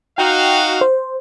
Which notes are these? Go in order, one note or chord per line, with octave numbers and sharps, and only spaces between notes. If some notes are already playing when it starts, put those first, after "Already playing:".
D#4 F#4 F5 G5
C5